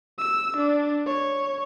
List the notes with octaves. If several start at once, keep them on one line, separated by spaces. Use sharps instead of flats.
E6
D4
C#5